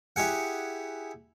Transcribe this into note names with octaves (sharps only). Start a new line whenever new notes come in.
E4 G4 G#4 F#5